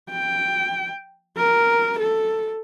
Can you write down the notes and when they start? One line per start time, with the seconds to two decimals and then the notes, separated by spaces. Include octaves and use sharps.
0.11 G5
1.37 A#4
1.99 A4